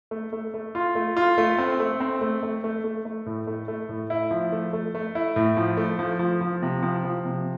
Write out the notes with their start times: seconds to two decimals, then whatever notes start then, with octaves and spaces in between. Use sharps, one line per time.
0.11 A3
0.33 A3
0.54 A3
0.75 F4
0.95 A3
1.17 F4
1.38 A3
1.58 C4
1.80 A3
2.00 C4
2.21 A3
2.43 A3
2.64 A3
2.84 A3
3.05 A3
3.26 A2
3.47 A3
3.68 A3
3.89 A2
4.10 E4
4.31 F3
4.52 A3
4.73 A3
4.95 A3
5.15 E4
5.36 A2
5.57 F3
5.77 A3
5.99 F3
6.19 F3
6.41 F3
6.62 C3
6.83 F3
7.04 F3
7.25 C3